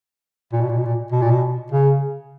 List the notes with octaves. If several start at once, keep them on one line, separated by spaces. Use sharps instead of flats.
A#2
B2
A#2
B2
A#2
B2
A#2
B2
C#3